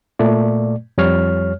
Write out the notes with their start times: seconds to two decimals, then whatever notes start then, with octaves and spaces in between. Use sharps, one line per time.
0.19 A#2 A3 D5
0.98 F2 G3 C#5 F6